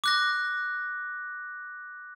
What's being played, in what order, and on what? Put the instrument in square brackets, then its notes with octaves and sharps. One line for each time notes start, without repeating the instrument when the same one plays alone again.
[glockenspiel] D6 F#6 A#6